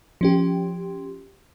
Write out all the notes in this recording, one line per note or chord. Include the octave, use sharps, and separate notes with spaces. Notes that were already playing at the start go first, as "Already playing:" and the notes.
F3 C#4 G4